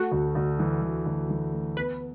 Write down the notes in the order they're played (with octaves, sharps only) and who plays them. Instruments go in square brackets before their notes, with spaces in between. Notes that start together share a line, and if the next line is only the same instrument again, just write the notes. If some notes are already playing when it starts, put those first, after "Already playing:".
Already playing: [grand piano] A3 [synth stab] F#4
[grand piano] D2
D2
E3
D2
D2
E3
A3
[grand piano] B3 [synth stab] B4